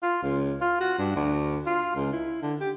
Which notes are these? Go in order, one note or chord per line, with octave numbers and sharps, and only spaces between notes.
F4
C#2
F4
F#4
G2
D2
F4
C#2
E4
D3
G4